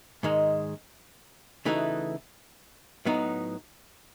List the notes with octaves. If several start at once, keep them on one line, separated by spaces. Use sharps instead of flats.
G#2 D#3 G#3
C#3 E3 A3 D#4 F#4
A2 F#3 B3 D#4